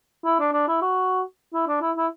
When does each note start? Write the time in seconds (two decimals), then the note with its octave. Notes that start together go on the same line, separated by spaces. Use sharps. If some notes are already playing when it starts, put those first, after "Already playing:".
0.25 E4
0.39 D4
0.53 D4
0.68 E4
0.82 F#4
1.54 E4
1.68 D4
1.81 E4
1.97 E4